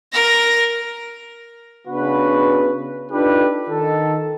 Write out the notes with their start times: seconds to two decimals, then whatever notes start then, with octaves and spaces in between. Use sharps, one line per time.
0.13 A#4 A#6
1.88 C#3 B3 D4 F#4 B4
3.11 D4 D#4 F4 G4 A4 B4
3.68 D#3 A4